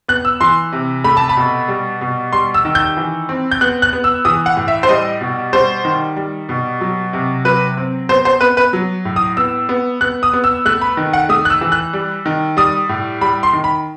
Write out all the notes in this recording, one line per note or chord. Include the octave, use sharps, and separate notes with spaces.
B3 F#6
E6
E3 C6
C3
A3 B5
A5
B5
B2
G3
B2
G3 C6
E6
D#3
G6
E3
C4
G6
B3 F#6
F#6
B3
E6
E3 D#6
F#5
A2
E5
C5
G3 D#5
B2
G3 C5
D#3
G3
B2
F#3
C3
F#3 B4
C4
B3 C5
C5
B3 B4
B4
F#3
A2
D#6
B3 E6
B3
B3 F#6
D#6
B3
E6
A3 F#6
B5
D#3
F#5
A3 D#6
F#6
E6
E3
F#6
G3
D#3
G3 D#6
A2
G3 B5
C6
D#3
B5